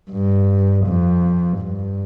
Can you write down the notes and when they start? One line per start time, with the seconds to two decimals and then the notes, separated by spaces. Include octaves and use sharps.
0.11 G2
0.86 F2
1.60 G2